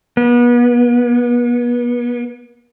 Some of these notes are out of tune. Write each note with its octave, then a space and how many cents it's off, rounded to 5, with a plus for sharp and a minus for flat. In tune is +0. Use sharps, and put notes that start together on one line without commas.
B3 -35